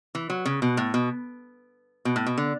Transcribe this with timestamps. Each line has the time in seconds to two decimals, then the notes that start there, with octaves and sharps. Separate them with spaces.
0.15 E3
0.30 F#3
0.45 C#3
0.62 B2
0.77 A2
0.94 B2
2.05 B2
2.16 A2
2.26 B2
2.38 D3